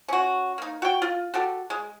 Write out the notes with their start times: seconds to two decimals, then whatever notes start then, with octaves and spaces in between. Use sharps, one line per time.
0.08 C#4 F#4
0.58 A#3 D#4
0.82 F#4 G5
1.02 F4
1.34 F#4 G4 A4
1.70 G#3